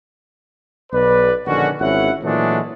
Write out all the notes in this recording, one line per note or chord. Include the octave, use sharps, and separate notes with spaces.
B1 B4 D5
A#1 D3 D#3 C#4 F#4
G#1 C#4 E4 F#5
A#2 E3 F#3 G#3 A3 D4